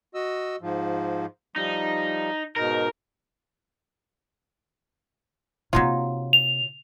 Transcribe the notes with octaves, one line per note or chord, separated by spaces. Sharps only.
F#4 D#5 E6
G#2 F3
F3 G3 D#4
G#2 B2 D#4 A#4
C3 F#3 A#3 D#4 F4
F7